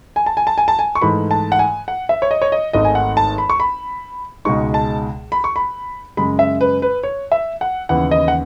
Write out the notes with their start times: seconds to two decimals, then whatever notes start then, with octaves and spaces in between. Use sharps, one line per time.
0.16 G#5
0.26 A5
0.37 G#5
0.47 A5
0.58 G#5
0.68 A5
0.79 G#5
0.95 C#6
1.02 G#2 E3 A3 B5
1.31 A5
1.52 F#5
1.59 G#5
1.88 F#5
2.09 E5
2.22 C#5
2.31 D#5
2.42 C#5
2.52 D#5
2.73 G#1 G#2 D#3 A3 D#4 D#5
2.85 G#5
2.95 F#5
3.17 A5
3.38 B5
3.50 C#6
3.60 B5
4.45 C#2 B2 G#3 D#4 C#6
4.74 A5
5.32 B5
5.44 C#6
5.56 B5
6.17 F#2 C#3 G#3 B5
6.39 E5
6.61 B4
6.82 B4
7.03 C#5
7.32 E5
7.61 F#5
7.89 D#2 C#3 E3 B3 F#5
8.11 D#5
8.28 F#5